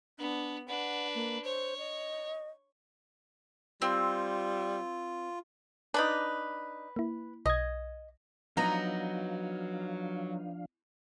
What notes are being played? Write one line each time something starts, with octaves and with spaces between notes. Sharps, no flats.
B3 D4
D4 B4 F#5
A#3
C5 C#5
D#5
G3 C4 F4
D4 D#4 B4 B5 D6
A#3 E4
B1 D#5 G#6
F3 F#3 B3 D4 D#4 F5 A#5